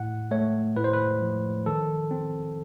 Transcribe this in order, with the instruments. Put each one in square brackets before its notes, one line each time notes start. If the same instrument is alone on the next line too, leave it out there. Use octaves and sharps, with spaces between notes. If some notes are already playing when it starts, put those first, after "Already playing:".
Already playing: [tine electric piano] A2 F#5
A3 C#5
A2 B4
C5
B4
F3
D#3 A4
C4